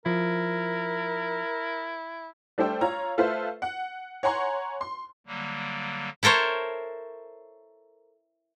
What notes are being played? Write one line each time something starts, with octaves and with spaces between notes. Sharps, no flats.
F3 E4 A#4
G3 A3 D4 C5 G5 E6
F4 C#5 A#5
A3 F4 A4 B4 C5 E5
F#5
C#5 F#5 G#5 A#5 C6 C#6
C6
D3 F#3 G3 A#3
E4 A4 A#4 C5 C#5